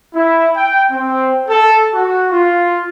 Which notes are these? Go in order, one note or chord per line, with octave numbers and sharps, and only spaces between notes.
E4
G5
C4
A4
F#4
F4